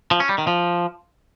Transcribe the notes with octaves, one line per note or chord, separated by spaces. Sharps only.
F3
C#4
G3
D#3
F3